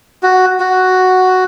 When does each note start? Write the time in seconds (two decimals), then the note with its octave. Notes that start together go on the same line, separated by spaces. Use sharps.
0.23 F#4
0.60 F#4